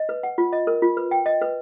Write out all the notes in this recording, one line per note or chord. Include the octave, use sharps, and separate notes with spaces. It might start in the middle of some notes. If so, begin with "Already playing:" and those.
Already playing: D#5
B4
F#5
F4
D#5
A#4
F4
B4
G5
D#5
B4